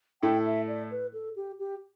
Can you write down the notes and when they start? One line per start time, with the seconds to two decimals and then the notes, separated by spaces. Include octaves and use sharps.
0.22 A2 A3 E4 A4 G5
0.46 E5
0.68 D5
0.91 B4
1.13 A4
1.36 G4
1.59 G4